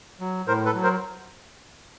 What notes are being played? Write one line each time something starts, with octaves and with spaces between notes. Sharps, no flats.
F#3
A2 A#4 C5
A4 B4
F#3
A#4 C5